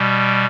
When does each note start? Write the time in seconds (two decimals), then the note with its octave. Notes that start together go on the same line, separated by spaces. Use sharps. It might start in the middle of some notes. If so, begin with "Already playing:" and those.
Already playing: B2 G3